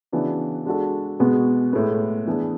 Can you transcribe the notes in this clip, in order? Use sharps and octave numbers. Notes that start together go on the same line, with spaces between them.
C#3 E3 B3 D4 F#4
G#3 D4 F#4 A4
B2 G#3 B3 F#4
A2 G#3 B3
E3 B3 D4 G#4